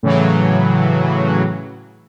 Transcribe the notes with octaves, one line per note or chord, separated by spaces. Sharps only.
A2 C#3 E3 F#3